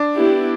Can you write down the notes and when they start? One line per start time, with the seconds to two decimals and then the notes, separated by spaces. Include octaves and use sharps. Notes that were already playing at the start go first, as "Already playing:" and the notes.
Already playing: D4
0.15 B3 E4 G4